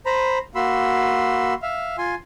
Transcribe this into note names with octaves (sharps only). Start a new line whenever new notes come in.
C5 A#5 B5
A#3 F#4 B5 C6 E6
E5 F5
F4 G#5 C6